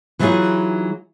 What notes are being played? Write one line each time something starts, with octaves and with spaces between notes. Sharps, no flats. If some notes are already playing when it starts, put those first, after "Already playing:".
E3 F#3 D#4 F4 G#4